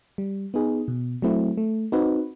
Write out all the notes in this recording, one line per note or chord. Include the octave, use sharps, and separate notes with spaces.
G3
B3 D#4 G#4
B2
F#3 A3 C4 E4
A3
C4 D#4 F#4 B4